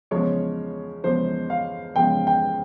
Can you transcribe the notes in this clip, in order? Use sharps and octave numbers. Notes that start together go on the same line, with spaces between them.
E2 C#3 F3 G#3 C#5
E2 C#3 F3 G#3 C5
F5
E2 C#3 F3 G#3 G5
G5